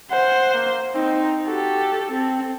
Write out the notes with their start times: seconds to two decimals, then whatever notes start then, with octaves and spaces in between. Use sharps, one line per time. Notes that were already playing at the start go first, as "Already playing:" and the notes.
0.11 C5 F#5
0.54 A#3
0.94 C4 D#4
1.46 F#4 G4 A4
2.11 C4 A4